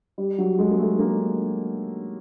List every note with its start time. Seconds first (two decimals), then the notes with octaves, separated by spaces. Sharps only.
0.18 G3
0.38 F#3
0.59 G#3
0.71 A#3
0.79 A3
0.99 A#3